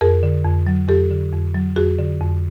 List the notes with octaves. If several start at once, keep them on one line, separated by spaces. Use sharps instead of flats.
F2 G#4 A#4
D3
F2
F#3
F2 G4 A4
D3
F2
F#3
F2 F#4 G#4
D3
F2